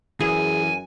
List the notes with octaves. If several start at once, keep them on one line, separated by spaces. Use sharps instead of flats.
F#2 E3 G#4 G#5